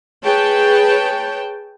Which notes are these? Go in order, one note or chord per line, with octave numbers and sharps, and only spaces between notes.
G#4 B4 C#5 G5 A5